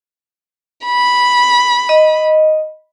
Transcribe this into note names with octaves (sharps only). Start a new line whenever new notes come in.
B5
D#5